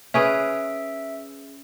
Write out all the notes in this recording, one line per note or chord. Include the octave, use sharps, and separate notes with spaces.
C#4 G#4 B4 E5 D7